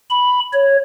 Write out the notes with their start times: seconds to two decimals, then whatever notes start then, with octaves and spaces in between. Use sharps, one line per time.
0.10 B5
0.53 C#5